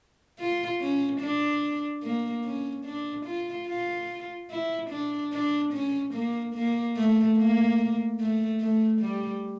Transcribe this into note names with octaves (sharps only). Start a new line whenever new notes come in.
F4
C#4
D4
A#3
C#4
D4
F4
F4
E4
D4
D4
C#4
A#3
A#3
A3
A#3
A3
A3
G3